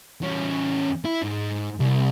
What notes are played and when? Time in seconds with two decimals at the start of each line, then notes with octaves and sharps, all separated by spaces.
0.22 E2 C#4
1.05 E4
1.23 G#2
1.80 C2